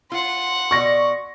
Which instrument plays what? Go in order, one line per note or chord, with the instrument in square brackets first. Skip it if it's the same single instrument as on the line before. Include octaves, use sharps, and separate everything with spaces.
[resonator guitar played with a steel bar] F4 [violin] F#5 C6
[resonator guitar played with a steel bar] B2 D5 [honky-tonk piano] C#6 A#6